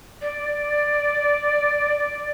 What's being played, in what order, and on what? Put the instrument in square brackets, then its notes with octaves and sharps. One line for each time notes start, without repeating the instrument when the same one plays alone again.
[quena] D5